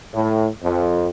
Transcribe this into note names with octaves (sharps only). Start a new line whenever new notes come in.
A2
F2